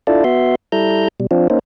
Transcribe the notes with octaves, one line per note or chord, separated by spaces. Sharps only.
D4 E4 F4 A4 D5
B3 F#4 E5 C6
G3 E4 A4 A#5 G6
B2 G3
F3 C4 D4 F4
A#3 C#4 D#4 C5